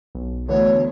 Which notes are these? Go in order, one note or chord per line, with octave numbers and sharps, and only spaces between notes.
B1
D2 D3 E3 B3 C#5